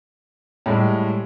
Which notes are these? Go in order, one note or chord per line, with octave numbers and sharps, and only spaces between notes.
A2 G3 G#3